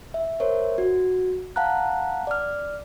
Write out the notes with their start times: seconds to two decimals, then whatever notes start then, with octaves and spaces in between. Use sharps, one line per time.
0.14 E5
0.40 A#4 C5 C#5 E5
0.78 F#4
1.56 F5 F#5 A5 A#5 F#6
2.27 D5 F6